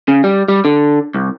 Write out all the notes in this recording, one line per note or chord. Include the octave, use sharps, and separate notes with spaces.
C#3
G3
G3
D3
C2